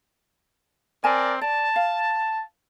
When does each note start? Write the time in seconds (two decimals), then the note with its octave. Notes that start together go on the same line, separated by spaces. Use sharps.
1.04 C4 A#4 D5 G#5 A5
1.41 D5 A5
1.76 F5